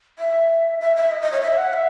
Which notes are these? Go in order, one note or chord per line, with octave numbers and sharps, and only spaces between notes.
E5
E5
E5
D#5
D#5
C#5
E5
F#5
E5